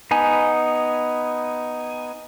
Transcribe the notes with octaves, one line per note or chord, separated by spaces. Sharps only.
B3 D#4 G#5